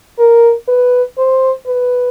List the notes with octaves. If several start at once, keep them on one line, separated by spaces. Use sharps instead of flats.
A#4
B4
C5
B4